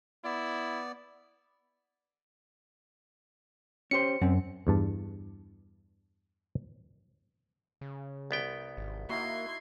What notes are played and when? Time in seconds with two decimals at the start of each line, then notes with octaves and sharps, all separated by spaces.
0.25 B3 E4 D5
3.91 C#4 G4 C5 C#7
4.22 F#2 C3 C4
4.67 E2 G2 A5
7.81 C#3
8.31 C2 B3 G5
8.77 G#1
9.09 A#3 D#4 E4 F#4 C6 G#6